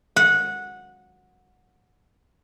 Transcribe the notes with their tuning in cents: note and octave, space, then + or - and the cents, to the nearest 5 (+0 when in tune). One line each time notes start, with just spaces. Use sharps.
F#5 -15